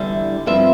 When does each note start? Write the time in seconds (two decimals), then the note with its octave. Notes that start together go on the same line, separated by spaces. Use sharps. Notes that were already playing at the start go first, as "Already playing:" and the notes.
Already playing: E2 D3 G3 E5
0.46 G2 F3 C4 E5